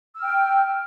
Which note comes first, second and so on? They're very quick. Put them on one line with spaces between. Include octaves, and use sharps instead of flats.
E6 F6 G5